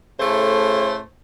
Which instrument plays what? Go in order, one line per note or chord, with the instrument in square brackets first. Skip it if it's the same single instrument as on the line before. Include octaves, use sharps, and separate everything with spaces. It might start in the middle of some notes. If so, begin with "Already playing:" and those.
[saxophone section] A2 C#3 A3 C5